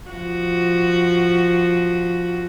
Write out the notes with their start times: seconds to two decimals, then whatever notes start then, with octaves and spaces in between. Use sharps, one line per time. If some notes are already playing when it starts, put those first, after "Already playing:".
0.11 F3 F#4